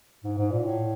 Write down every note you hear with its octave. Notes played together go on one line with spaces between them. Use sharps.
G#2
G#2
A#2
A2